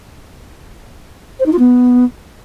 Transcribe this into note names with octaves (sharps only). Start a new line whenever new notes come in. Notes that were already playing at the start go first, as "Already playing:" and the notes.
C5
D#4
F4
B3